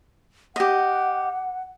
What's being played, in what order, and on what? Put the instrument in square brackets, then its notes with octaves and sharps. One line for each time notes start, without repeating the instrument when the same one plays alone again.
[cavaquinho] G4 D#5 [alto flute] F#5